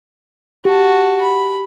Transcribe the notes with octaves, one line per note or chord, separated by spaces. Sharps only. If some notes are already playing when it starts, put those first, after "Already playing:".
F#4 G4 A5
B5